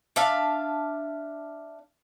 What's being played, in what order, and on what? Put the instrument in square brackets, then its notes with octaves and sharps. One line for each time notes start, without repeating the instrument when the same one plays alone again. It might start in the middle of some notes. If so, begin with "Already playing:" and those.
[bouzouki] D4 E5 F5 A5